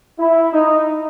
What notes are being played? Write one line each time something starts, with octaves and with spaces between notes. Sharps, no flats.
E4
D#4